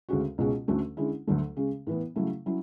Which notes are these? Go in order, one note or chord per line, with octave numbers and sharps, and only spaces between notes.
D2 C#3 G#3 C#4 F#4
C#2 B2 G#3 C#4 F#4
D2 D3 A3 C#4 F#4
D3 G#3 C#4 E4
D2 D3 F#3 A3
C#3 G#3 C#4
A2 E3 B3
C#3 F#3 A3 E4
F#3 C#4 E4